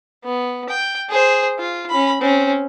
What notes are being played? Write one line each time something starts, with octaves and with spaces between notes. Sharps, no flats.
B3
G5
G#4 C5
F4
C#4 B5
C4 C#4